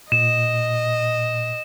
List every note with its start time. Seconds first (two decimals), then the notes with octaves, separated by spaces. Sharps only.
0.12 A#2 D#5 E7